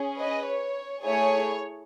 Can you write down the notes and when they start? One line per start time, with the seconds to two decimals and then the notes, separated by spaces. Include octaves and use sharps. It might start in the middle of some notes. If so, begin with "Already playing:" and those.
Already playing: C#4 G#4
0.18 B4 D#5
0.46 C#5
1.03 A3 E4 G#4 C#5